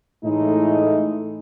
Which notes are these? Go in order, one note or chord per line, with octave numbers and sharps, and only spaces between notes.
A2 E3 G#3 A3 D#4